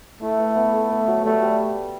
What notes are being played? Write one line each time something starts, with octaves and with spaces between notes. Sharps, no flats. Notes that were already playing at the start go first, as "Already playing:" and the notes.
A3 E4
B4
B3
A4
B3
F#3
G3 A3
G3